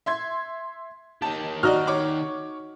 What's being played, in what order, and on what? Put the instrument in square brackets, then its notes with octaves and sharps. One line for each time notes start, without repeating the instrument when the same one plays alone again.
[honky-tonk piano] E5 C6 G#6
[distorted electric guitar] D#3 G4 [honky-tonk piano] A5
[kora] D#4 F#4 [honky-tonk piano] D5 D#5 F6
[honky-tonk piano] C#5 C#6 D6